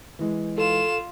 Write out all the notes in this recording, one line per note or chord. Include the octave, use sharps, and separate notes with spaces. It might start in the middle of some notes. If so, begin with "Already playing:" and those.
E3 G#3
F4 A4 E7